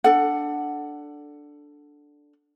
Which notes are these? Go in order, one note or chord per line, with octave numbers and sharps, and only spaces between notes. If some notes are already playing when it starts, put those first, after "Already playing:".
D4 A4 F#5